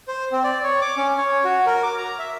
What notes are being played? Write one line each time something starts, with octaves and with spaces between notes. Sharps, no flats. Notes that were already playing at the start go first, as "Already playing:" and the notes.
C5
C4
D5
C#5
D6
C#4
C#5
F#4
A#4
D6
A#5
E5